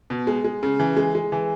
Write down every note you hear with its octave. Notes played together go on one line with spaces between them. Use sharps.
B2
G#3
G#3
C#3
E3
G#3
G#3
E3